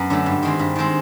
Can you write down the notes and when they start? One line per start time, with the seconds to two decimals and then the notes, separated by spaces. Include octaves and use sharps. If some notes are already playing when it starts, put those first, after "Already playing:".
Already playing: F#2 B3
0.10 D3 F#3 A3
0.26 G2
0.43 D#3 G#3 C4
0.59 G2
0.76 D#3 G#3 C4